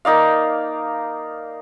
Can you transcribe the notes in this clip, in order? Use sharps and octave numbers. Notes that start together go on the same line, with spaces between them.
A#3 D#4 D5 F5